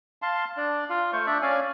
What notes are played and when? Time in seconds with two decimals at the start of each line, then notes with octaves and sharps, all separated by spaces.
0.22 F5 A5 C6
0.57 D4 D5
0.90 F4 F5
1.13 A3 C5 C#6
1.26 D4 D5 E5
1.42 C#4 D5 F5 G#5